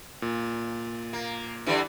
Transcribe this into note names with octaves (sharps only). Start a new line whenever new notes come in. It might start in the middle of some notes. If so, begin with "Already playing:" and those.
A#2
A#3
D3 E3 G3